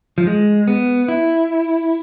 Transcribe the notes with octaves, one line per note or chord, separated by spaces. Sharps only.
F3
G#3
B3
E4